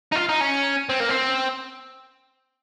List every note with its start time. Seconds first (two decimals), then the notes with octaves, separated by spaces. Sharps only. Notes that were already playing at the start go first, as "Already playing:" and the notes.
0.12 D#4
0.15 F4
0.29 D#4
0.41 C#4
0.89 C4
1.00 A#3
1.09 C4